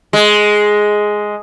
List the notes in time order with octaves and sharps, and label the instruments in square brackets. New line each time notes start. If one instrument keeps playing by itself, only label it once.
[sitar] G#3